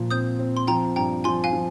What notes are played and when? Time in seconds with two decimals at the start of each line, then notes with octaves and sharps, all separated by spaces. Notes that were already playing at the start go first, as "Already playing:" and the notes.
Already playing: A#2 F3
0.11 C4 D#6 G6
0.39 C4
0.57 C6
0.67 F3 G5 A#5
0.96 G2 G5 A#5
1.24 F3 G#5 C6
1.44 F5 G#5
1.53 F3